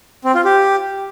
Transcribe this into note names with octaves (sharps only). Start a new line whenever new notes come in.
C4
F4
G4